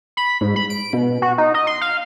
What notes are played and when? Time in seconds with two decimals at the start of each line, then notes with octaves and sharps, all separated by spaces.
0.17 B5
0.41 G#2
0.56 B5
0.70 D7
0.93 B2
1.22 F#4
1.38 D#4
1.54 D#5
1.67 C6
1.81 F5